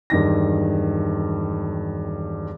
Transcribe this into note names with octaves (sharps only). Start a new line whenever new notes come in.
E1 G2 D#3 A#6